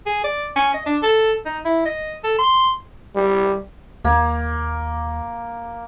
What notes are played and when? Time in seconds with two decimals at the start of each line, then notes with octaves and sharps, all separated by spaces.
0.06 G#4
0.24 D5
0.56 C#4
0.74 D#5
0.86 D4
1.03 A4
1.45 D#4
1.65 E4
1.85 D#5
2.24 A4
2.38 C6
3.16 G3
4.04 D#2 A#3